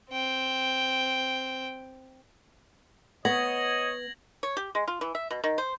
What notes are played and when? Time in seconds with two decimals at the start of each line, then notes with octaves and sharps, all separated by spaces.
0.10 C4 G5
3.25 B3 C#5 D#5 G#6 A#6 F#7
4.43 C#5
4.57 G4
4.75 G#3
4.88 F4
5.01 E3
5.15 E5
5.31 B2
5.44 D#3
5.58 C5